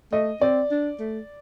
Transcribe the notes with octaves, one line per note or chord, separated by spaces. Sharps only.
A3 D#5
C4 D5
D4
A3